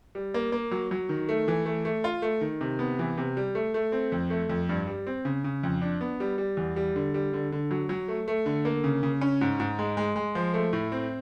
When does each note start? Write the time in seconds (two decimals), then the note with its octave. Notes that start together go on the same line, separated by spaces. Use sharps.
0.15 G3
0.34 A#3
0.52 A#3
0.71 F#3
0.91 F#3
1.09 D#3
1.29 A3
1.48 E3
1.66 A3
1.85 A3
2.04 F4
2.22 A3
2.41 D#3
2.61 C3
2.79 B3
2.99 E3
3.18 C3
3.37 G3
3.55 A3
3.74 A3
3.92 C4
4.12 F2
4.30 A3
4.49 F2
4.69 G2
4.87 G3
5.07 C4
5.25 C#3
5.44 C#3
5.63 F2
5.82 D4
6.01 B3
6.20 G3
6.38 G3
6.57 E2
6.76 G3
6.96 D3
7.14 G3
7.33 D3
7.52 D3
7.71 F#3
7.89 F#3
8.08 A3
8.28 A3
8.46 D3
8.65 A#3
8.84 C#3
9.03 C#3
9.22 C#4
9.41 G#2
9.60 G#2
9.79 G#3
9.97 G#3
10.16 G#3
10.35 F3
10.54 A3
10.73 A2
10.92 C4